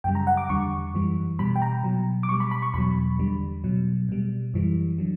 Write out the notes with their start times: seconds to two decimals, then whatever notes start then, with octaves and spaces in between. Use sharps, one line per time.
0.04 F#2 C#3 G3 G5
0.15 A#5
0.27 F#5
0.37 D6
0.49 E2 D3 G3 C#6
0.94 F#2 E3 G3
1.39 B2 G3 B5
1.56 G5
1.62 A#5
1.84 B2 F#3
2.23 D6
2.29 B2 G3 C#6
2.40 B5
2.51 B5
2.62 C#6
2.74 E2 B2 F#3 B5
3.19 E2 D3 G3
3.64 B2 F#3
4.09 B2 G3
4.54 F#2 E3 G3
4.98 D3 F#3